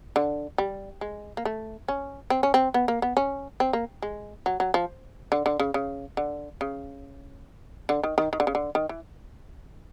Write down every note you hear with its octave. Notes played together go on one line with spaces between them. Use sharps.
D3
G3
G#3
A#3
A3
C#4
C4
C#4
C4
B3
A#3
B3
C#4
C4
A#3
G#3
F#3
F#3
F3
D3
D3
C#3
C#3
D3
C#3
D3
D#3
D#3
D#3
D3
C#3
D3
D#3
E3